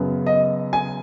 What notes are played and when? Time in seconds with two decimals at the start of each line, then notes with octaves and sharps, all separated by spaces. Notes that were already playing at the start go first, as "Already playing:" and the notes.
Already playing: F#2 C#3 B3
0.26 D#5
0.73 G#5